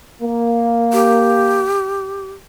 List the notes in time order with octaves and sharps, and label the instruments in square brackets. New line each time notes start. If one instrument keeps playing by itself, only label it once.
[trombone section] A#3
[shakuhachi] G4